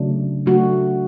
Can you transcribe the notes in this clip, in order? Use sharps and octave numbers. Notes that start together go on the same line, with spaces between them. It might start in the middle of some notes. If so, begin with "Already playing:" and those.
Already playing: C#3 F#3 A3 D4
C#3 F#3 A3 D4 F#4